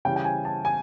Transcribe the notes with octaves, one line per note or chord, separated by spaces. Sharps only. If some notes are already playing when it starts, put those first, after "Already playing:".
C#3 E3 G3 G5
G5
G#5
A5
G#5